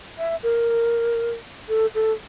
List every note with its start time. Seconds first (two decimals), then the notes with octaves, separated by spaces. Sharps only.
0.18 E5
0.43 A#4
1.69 A4
1.95 A4